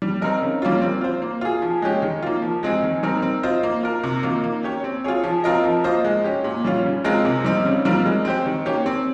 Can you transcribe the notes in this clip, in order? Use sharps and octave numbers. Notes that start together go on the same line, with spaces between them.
G3
C4 D#4 A#4 D#5
C#3
G3 A#3 C#4 F4
C4
F4 C5
A#3
F4 G#4
F3
G#3 C#4 G4
D#3
A#3 F4
F3
G#3 C4 D#4 G#4
D#3
G3 C4 D#4 A#4
C4
F4 C5 D#5
A#3
F4 A#4
C3
D#3 A#3 F4
A#3
C#4 G4 C#5
C4
F4 G#4 C#5
F3
C4 F4 A#4 D#5
F3
A#3 F4 C5 D#5
G#3
C#4 G4
A#2
G3 C#4 F4
C#3
G#3 C4 F4 A#4
C3
G3 C4 D#4
C#3
G3 C4 F4 A#4
G#3
C4 G4 C5
D#3
A#3 C#4 G4 C#5
C4